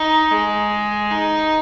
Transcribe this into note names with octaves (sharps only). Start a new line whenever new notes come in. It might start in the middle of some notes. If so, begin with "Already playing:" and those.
Already playing: D#4
G#3
D#4